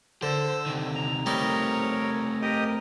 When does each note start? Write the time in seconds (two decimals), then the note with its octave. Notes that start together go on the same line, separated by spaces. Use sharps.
0.23 D3 C5 E6
0.66 C3 D#3
0.95 A#5
1.26 G3 A3 C4 D#4 A#4 C#5
2.42 G4 A#4 D#5